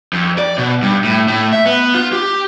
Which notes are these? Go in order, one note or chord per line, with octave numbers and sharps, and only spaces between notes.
F2
D5
B2
G2
A2
A2
E5
B3
F4
G4